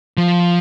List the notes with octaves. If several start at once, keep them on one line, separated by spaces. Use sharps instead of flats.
F3